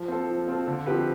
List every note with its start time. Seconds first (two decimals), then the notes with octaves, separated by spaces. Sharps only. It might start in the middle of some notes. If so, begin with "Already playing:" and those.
Already playing: F3
0.08 C4 F4 A4
0.29 F3
0.48 C4 F4 A4
0.67 D3
0.86 F3 C4 G4 B4